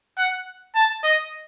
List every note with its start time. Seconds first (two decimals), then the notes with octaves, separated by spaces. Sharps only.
0.18 F#5
0.75 A5
1.04 D#5